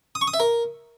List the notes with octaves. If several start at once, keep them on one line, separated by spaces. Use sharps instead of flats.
D#6
C#6
D#6
E5
A#4